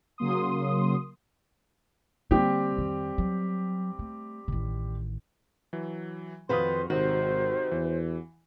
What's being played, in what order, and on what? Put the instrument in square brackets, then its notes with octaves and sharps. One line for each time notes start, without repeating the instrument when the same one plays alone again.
[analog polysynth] C#3 F#3 A#3 C6 D#6
[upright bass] D3 A#3 [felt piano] G3 C4 G4
[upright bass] F2 D#3
F#3
A3
A1 D#3
[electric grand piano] E3 F#3
[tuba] F2 [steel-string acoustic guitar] D#3 B4 C5 [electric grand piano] F#4 F5 D#6 [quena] C6
[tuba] G#1 [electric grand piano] C3 D#3 [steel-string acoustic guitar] F#4 [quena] C5
[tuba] E2 [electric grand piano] E3